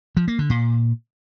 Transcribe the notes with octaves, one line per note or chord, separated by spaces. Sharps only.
F3
A#3
D3
A#2